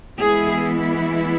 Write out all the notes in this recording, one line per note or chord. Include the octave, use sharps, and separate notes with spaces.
E3 G#3 B3 E4 G#4